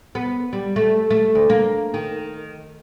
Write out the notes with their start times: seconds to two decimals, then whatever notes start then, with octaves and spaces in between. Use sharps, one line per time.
0.15 B3
0.53 G3
0.76 A3
1.10 A3
1.35 D2
1.50 A#3
1.94 D#3